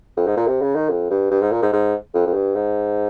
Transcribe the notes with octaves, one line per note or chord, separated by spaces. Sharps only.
F2
G#2
A#2
C3
C#3
D#3
F2
G2
G2
G#2
A#2
G#2
G#2
F2
F2
G2
G#2